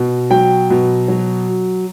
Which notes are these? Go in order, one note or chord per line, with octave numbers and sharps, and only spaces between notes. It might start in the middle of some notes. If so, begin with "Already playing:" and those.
Already playing: B2
F#3 G5
B2
F#3